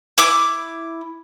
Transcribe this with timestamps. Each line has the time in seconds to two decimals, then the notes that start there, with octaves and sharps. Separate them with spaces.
0.18 E4 D6